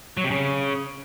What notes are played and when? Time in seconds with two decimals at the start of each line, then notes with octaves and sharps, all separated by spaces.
0.17 F#3
0.24 C3
0.31 C#3